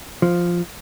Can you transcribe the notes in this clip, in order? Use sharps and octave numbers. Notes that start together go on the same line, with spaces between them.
F3